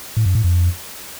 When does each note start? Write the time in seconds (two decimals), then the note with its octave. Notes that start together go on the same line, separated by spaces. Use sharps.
0.17 A2
0.26 F#2
0.35 A2
0.44 F2